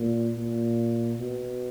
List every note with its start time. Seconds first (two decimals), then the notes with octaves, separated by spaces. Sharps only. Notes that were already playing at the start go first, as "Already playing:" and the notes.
Already playing: A#2
0.37 A#2
1.20 B2